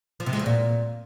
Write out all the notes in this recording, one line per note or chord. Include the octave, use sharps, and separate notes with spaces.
F3
C3
G#3
E2
A#2